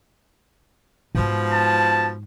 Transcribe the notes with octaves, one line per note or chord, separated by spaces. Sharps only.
G#2 B2 F3 G#3
A5